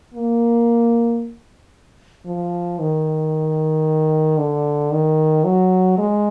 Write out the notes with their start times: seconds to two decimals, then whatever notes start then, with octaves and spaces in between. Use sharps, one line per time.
0.14 A#3
2.26 F3
2.79 D#3
4.38 D3
4.91 D#3
5.45 F#3
5.98 G#3